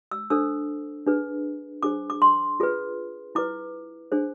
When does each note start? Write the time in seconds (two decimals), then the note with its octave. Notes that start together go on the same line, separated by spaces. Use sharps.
0.11 E6
0.30 D4 A4 C5 E6
1.06 D4 G#4 B4
1.83 D4 G#4 C5 D6
2.10 D6
2.22 C6
2.60 F4 G#4 B4
3.35 E4 B4 D6
4.12 D4 G#4 C5